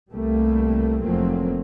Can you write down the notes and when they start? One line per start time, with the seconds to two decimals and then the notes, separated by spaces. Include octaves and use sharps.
0.12 C2 G3 A3 A#3
1.01 F1 F3 F#3 A3 A#3 C4